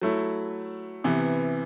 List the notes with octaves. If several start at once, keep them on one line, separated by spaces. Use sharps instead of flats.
F#3 A3 E4
C3 E3 B3